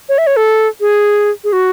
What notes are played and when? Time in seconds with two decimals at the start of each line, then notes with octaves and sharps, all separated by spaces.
0.09 C#5
0.18 E5
0.27 C#5
0.36 A4
0.81 G#4
1.44 G#4
1.53 F#4